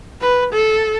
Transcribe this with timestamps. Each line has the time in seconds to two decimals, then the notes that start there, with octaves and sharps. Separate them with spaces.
0.21 B4
0.53 A4